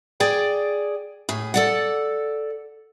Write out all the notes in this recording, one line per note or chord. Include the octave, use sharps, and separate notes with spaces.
G#4 D5 G5
A2 G#4
A4 D5 F#5